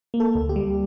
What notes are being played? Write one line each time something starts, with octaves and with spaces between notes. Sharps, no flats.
A#3
A4
D2
G4
G3